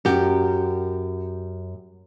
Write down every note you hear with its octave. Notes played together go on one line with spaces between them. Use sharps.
F#2 G4